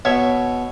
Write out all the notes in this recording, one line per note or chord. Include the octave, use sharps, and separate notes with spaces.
B2 C#5 E5